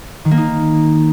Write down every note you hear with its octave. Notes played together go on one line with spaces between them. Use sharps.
D#3
A#3
D#4